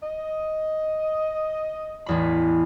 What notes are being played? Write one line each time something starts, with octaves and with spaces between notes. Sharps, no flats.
D#5
A1 E2 B5